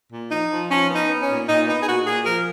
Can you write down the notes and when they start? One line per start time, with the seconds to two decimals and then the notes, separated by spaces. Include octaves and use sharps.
0.12 A#2
0.30 F3 D#4
0.50 F3
0.69 F3 C#4
0.89 B3
0.96 D#4
1.08 B3
1.21 C#4
1.28 A#2
1.47 A#2 D#4
1.67 B3 D#4
1.81 G#4
1.86 A#2 F#4
2.06 A#2 G#4
2.25 F3 A#4